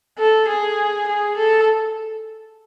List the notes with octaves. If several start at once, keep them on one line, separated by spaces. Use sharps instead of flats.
A4
G#4
G#4
A4